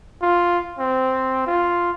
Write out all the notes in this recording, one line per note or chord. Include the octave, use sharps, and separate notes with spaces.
F4
C4
F4